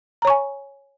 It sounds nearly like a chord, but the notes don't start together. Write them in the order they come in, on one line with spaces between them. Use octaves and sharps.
A#5 C#5 C#6 G#5